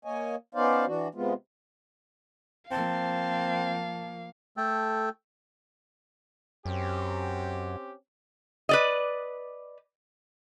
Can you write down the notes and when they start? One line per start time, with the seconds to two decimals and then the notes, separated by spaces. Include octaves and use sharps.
0.05 A#3 C#5 D#5 G#5
0.55 B3 C#4 D#4 C5 D5 F5
0.87 E3 D4 F#4
1.15 C3 G#3 B3 F4
2.71 F3 A#3 C4 F5 A5
4.57 A3 A4 G5
6.66 F#2 C4 C#4 G4
8.69 B4 D5 D#5